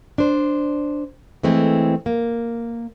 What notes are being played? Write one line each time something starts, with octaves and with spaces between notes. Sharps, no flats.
D4 C5
E3 G#3 A3 C4
A#3